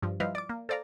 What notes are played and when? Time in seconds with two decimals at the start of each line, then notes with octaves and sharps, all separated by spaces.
0.02 G2 F3
0.20 F3 G3 E4 B4 D#5 F5
0.35 D5 D6
0.49 A#3
0.69 A4 C5 D5 F5 A#5